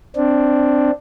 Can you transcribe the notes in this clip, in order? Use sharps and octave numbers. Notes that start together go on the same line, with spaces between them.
C4 D4